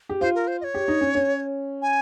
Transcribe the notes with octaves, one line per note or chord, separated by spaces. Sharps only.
G4
F4 C5
A#4
C5
D#5
C#5
G4
D#4
C#4
C#4
G#5